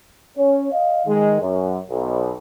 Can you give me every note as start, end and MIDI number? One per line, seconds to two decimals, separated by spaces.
0.37 0.68 61
0.37 0.68 73
0.72 1.05 75
0.72 1.05 77
1.06 1.37 51
1.06 1.37 56
1.41 1.80 42
1.90 2.35 35